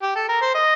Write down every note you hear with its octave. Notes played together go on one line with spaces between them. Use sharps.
G4
A4
A#4
C5
D#5